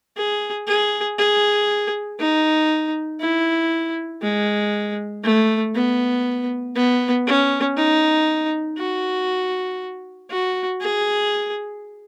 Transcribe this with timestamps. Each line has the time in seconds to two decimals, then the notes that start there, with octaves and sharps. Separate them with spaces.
0.17 G#4
0.67 G#4
1.19 G#4
2.19 D#4
3.20 E4
4.22 G#3
5.24 A3
5.75 B3
6.75 B3
7.27 C#4
7.77 D#4
8.78 F#4
10.30 F#4
10.81 G#4